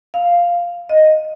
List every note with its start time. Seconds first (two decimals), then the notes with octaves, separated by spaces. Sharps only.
0.14 F5
0.89 D#5